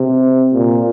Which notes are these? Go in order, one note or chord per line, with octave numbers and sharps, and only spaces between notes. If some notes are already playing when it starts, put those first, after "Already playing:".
Already playing: C3
A#2